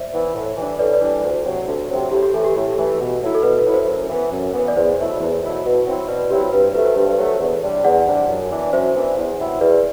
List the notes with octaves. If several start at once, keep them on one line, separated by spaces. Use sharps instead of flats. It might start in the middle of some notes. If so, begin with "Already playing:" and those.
Already playing: C5 D5 E5
E3 B3 E4
A2
E3 G3 D4
A2 B4 D5
B4 D5
E3 G3 D4
D2
C3 F#3 C4
D2
C3 F#3 C4
A2 G4
G4
E3 A3 A4
G4
A2
E3 A3
B2
F#3 A3 E4
A4
B2 B4
B4
F#3 A3 E4
C5
F#2
E3 B3
F#2
E3 B3
D5
E2 C5
B2 F#3 A3 E4
E2
B2 F#3 A3 E4
B2
F#3 C4 E4
B2 B4 D5
B4
F#3 C4 E4 G4
G2 B4
C5
F#3 A3 B4
C5
G2 B4
F#3 A3
E2
C3 G3 D4
E2 D5 F#5
C3 G3 D4
F#2
E3 B3 D4
F#2 C5 E5
E3 B3 D4
E2
C3 F#3 B3 E4
E2 B4 D5